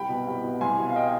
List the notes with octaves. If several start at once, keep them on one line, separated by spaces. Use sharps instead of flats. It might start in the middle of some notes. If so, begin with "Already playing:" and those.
Already playing: C2 G5 B5
B2
C2
B2
C2 G#5 C6
B2
F5
D#5 G5